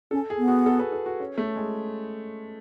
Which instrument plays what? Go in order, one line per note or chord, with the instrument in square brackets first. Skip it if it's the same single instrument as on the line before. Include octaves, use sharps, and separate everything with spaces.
[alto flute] C#4 [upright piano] A4
[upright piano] G#4
[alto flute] B3
[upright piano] F#4
A4
B4
A4
F#4
C#4
A3
G#3